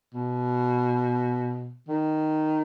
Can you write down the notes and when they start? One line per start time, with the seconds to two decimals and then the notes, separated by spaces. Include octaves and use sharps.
0.14 B2
1.88 D#3